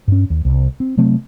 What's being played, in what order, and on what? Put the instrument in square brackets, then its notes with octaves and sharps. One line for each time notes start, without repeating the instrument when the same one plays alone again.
[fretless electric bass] G2 C#4
D#2
C2
C4
C3 F#3 A3 C4